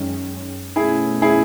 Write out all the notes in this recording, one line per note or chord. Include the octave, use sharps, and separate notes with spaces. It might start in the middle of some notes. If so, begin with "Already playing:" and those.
Already playing: F#2 D#3 G#3 C#4
B2 A3 C#4 E4 G#4
E4 G#4